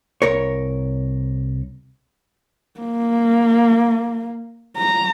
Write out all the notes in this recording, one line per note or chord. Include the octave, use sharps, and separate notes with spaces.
C2 A#4 C#5
A#3
A#5